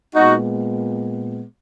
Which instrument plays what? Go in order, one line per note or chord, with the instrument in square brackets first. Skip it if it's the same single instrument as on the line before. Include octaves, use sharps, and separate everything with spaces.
[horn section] A#2 G#3 B3 D#4 F#4